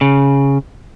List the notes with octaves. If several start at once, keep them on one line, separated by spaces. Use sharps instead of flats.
C#3